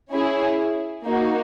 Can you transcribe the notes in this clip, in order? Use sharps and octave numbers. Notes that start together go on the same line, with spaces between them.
C#4 E4 G#4
A#3 D#4 F#4